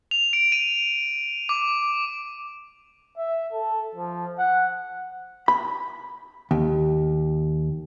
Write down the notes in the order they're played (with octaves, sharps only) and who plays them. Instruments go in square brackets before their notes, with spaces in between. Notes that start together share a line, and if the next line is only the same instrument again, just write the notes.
[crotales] F7
D7
D#7
D6
[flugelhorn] E5
A4
F3
F#5
[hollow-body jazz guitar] B5
D#2